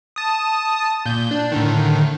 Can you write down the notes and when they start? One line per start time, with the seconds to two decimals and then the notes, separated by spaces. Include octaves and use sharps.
0.16 A5 D#6
1.06 A#2 G6
1.31 D4
1.52 A2 D3 D#3